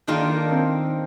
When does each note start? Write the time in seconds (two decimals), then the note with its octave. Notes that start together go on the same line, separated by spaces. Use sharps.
0.07 D#3 A#3 D4 D#4 F4
0.51 C4